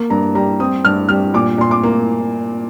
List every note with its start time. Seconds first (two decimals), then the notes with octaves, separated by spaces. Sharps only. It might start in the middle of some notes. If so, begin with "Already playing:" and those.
Already playing: A#3
0.10 G2 A#5
0.35 G3 A#5
0.60 C4 D#6
0.85 G2 F6
1.09 G3 F6
1.34 A#2 D6
1.58 A#2 C6
1.71 D6
1.83 A#3